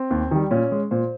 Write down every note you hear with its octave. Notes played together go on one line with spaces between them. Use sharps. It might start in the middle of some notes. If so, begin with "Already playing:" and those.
Already playing: C4
D#2
D#3 G3
A#2 C#4
G#3
A#2 C5